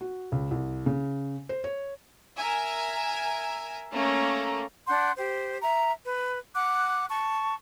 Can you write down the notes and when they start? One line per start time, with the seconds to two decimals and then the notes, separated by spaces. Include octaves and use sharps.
0.01 F#4
0.32 C#2
0.51 C2
0.86 C#3
1.49 C5
1.64 C#5
2.37 A#4 E5 G#5
3.93 A3 A#3 C#4 A#5
4.88 D4 F#5 C6 G6
5.17 G4 C5
5.62 E5 A#5
6.04 B4
6.54 F#5 D6 F#6
7.10 A5 C#6